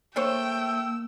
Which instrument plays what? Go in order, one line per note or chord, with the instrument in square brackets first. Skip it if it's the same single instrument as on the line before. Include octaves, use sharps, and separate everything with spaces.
[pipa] A3 C5 C#5 [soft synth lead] A#3 [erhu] G5 [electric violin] E6